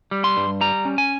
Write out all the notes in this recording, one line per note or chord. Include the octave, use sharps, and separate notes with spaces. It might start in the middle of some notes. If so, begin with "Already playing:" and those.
G3
C6
G2
G3 A#5
C#4
G#5